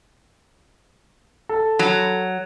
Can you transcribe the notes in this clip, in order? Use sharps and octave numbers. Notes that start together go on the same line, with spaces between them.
A4
F#3